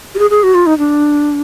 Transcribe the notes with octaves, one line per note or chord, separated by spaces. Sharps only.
G4
G#4
G#4
F#4
F4
D#4
D4